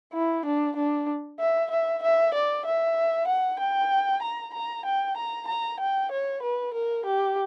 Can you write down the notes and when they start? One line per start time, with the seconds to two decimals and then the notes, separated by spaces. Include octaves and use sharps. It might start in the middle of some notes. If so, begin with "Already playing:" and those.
0.14 E4
0.46 D4
0.76 D4
1.40 E5
1.71 E5
2.03 E5
2.34 D5
2.65 E5
3.27 F#5
3.59 G5
4.22 A#5
4.54 A#5
4.85 G5
5.17 A#5
5.47 A#5
5.80 G5
6.11 C#5
6.42 B4
6.74 A#4
7.05 G4